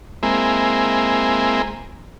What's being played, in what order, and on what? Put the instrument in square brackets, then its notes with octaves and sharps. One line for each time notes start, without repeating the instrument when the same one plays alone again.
[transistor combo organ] G#3 A#3 C4 E4